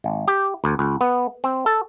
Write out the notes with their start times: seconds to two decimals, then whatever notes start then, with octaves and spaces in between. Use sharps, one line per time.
0.04 G#1
0.28 G4
0.64 D2
0.79 C#2
1.01 B3
1.44 C4
1.66 A4